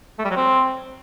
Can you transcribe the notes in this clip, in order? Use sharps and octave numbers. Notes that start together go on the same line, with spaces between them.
A3
G3
F#3
C4